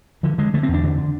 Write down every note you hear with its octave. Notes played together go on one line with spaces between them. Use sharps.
D3 F3
D3 G#3
D3 A3
C4
E2
D4
D3
D3